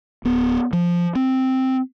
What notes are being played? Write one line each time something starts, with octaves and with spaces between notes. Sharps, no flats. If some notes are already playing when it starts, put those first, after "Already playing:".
D1 B3
F3
C4